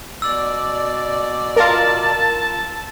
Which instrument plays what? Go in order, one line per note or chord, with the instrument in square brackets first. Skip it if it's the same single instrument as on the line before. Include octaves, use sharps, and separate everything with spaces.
[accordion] B2 D5 [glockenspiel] E6
[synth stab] F4 A#4 [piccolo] A5